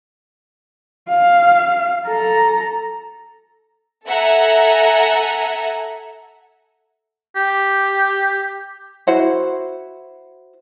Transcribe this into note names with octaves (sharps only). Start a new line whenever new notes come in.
F5
A4 A#5
A4 E5 F#5 G#5 A#5
G4
E4 F#4 C5 F#5